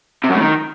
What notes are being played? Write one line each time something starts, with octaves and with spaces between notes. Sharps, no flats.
C3
F#2
A2
D#3